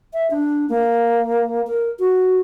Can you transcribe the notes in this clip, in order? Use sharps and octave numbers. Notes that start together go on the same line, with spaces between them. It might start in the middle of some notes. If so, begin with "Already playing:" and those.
E5
D4
A#3
A#4
F#4